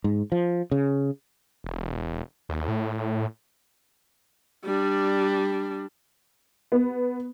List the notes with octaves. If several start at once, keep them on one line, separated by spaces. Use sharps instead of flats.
G#2
F3
C#3
E1
D#2
A2
G3 D4
B3